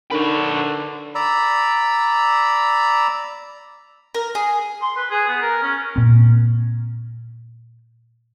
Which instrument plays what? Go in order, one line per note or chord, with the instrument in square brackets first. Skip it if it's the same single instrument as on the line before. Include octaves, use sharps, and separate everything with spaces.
[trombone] D3 [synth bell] D4 D#4 A#4 [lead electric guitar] B4 C#5
[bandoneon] D5 A#5 B5 E6
[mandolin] A#4
G#4
[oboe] C6
B4
G#4
B3
A#4
C#4
[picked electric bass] A#2 C4